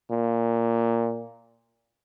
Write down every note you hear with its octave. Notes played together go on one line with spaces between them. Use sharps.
A#2